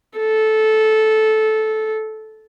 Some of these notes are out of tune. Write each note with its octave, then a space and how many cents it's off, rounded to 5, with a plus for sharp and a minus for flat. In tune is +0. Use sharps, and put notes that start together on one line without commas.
A4 -15